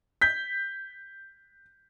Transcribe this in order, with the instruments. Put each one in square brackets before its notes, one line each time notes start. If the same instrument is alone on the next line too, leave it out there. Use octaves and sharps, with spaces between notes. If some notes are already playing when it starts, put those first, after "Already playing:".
[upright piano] G6 B6